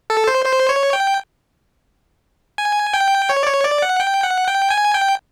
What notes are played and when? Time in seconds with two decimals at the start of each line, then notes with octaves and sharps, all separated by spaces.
0.10 A4
0.27 C5
0.45 C5
0.69 C#5
0.93 G5
2.58 G#5
2.93 G5
3.29 C#5
3.43 D5
3.47 C#5
3.64 D5
3.82 F#5
4.00 G5
4.23 F#5
4.48 G5
4.70 G#5
4.94 G5